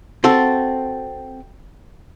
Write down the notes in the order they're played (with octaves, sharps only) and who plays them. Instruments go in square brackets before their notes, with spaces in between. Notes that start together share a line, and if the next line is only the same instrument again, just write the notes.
[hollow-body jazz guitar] C4 F#4 A4